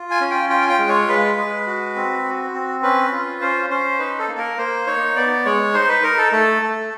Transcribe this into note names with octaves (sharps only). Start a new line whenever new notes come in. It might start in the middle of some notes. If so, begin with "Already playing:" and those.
Already playing: F4
G#5
C#4
G5
F4 G5
G#5
G5
G#3
C#5
G#3 B4
G#3
F#4
C4
F#4
C4
C#4 B4
F4
C#4 C5
C#4 C5
D#4 B4
A4
A#3
A#4
A#3 C5
D#4 C#5
B3 D5
G#3 C#5
D#4 C5
B4
D#4 A#4
A4
A3 A4
A3